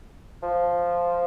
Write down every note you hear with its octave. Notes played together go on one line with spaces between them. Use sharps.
F3